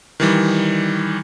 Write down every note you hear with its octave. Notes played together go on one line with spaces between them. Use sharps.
D#3 E3 G3